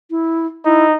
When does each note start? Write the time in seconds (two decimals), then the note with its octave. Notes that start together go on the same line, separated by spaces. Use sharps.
0.11 E4
0.65 D#4 E4